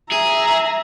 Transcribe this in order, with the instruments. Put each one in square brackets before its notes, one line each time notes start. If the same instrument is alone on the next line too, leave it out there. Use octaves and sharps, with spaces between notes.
[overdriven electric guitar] G#4 [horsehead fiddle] E5 A#5